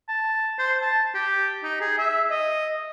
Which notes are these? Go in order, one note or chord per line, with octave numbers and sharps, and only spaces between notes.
A5
C5
A5
G4
D#4
G#4
E5
D#5